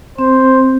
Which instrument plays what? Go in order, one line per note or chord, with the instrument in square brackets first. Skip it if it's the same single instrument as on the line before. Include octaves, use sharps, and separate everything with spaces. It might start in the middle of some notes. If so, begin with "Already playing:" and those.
[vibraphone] C4 [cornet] C5